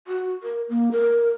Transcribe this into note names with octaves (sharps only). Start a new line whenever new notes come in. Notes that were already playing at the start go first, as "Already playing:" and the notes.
F#4
A#4
A#3
A#4